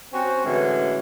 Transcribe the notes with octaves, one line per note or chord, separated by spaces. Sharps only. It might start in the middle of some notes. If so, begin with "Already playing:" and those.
C4 C#4 F#4 C5
A2 D3 E3 G#3 C#4 F#4